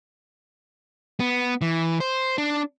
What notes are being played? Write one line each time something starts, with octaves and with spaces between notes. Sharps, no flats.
B3
E3
C5
D4